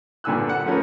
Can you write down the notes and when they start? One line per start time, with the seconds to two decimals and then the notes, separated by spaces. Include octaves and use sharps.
0.24 G2 A#2 D3 G#5 E6 F#6
0.49 F#5
0.66 F3 A3 C#4 A#4 B4